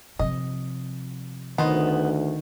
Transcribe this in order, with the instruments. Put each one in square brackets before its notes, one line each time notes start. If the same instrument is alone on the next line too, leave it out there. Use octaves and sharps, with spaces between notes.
[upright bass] C3 F3 [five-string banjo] D#5
[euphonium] D2 [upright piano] D#3 [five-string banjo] B3 C5 D#5